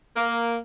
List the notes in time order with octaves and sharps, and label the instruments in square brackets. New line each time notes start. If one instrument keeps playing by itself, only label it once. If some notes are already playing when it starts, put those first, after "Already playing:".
[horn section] A#3